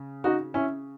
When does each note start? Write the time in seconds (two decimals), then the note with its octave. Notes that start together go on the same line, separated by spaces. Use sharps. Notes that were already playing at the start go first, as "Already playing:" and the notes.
Already playing: C#3
0.24 D#4 F#4
0.54 C#4 E4